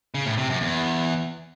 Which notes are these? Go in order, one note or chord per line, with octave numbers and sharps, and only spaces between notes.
C#3
A2
C3
F#2
E2